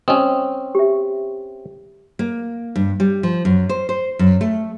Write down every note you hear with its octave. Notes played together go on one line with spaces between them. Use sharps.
C4 C#4 D#5 D#6
G4 E5
A#3
G2
G3
F3
F#2
C5
C5
F#2
A3